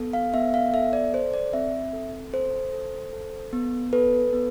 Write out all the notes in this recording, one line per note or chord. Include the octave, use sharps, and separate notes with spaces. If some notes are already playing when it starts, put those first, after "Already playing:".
Already playing: B3 A4
F5
B3 E5
F5
A4 E5
D5
A4 C5
D5
C4 E5
A4
A4 C5
A4
A4
B3
A4 B4
B3